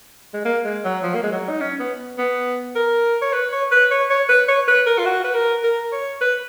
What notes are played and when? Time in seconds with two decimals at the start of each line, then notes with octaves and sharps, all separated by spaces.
0.34 G#3
0.45 A#3
0.65 G#3
0.84 F#3
1.03 F3
1.15 A#3
1.23 G#3
1.32 F#3
1.49 D#4
1.61 C#4
1.80 B3
2.18 B3
2.76 A#4
3.22 C#5
3.33 B4
3.52 C#5
3.72 B4
3.91 C#5
4.10 C#5
4.29 B4
4.48 C#5
4.68 B4
4.86 A#4
4.98 F4
5.06 F#4
5.24 B4
5.34 A#4
5.64 A#4
5.92 C#5
6.21 B4